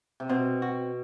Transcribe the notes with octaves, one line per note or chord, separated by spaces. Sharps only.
C3
B2 C4
F#4